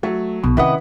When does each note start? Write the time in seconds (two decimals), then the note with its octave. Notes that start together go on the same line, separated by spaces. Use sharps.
0.03 F#3 A3
0.43 B1 B2
0.57 C3 D#3 C#4 E4 B4 D#5 F#5